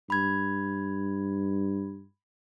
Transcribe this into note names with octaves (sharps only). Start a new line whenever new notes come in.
G2 B5 G#6